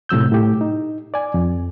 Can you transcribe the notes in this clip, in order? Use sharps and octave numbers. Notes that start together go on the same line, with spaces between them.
A2 C3 F#3 E6 G6
A2 G4
D#4
D5 G#5
F2